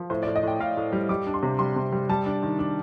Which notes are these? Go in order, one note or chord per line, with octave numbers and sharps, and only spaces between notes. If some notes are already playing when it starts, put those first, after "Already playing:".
Already playing: F3
A2 C5
D5
A2
D#5
A2 G5
A2 F5
A2
G3
G3 D6
D4
C6
C3
G3 C6
C3
G3
G3 A5
D4
D#3
D4